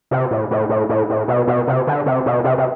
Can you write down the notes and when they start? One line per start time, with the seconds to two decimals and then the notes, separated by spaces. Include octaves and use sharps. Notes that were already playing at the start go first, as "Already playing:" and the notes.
0.11 C3
0.31 A2
0.51 A2
0.69 A2
0.89 A2
1.10 A2
1.28 B2
1.47 B2
1.67 C3
1.87 D3
2.06 C3
2.26 B2
2.44 C3
2.58 C3